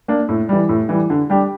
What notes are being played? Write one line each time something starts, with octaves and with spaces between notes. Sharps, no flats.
A#3 D4
A2
E3 G3
A2
E3 G3
D3
G3 D4 G4